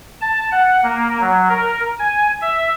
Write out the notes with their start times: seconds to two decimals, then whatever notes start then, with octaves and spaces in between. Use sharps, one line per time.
0.21 A5
0.51 F#5
0.83 A#3
1.20 F#3
1.49 A#4
1.99 G#5
2.41 E5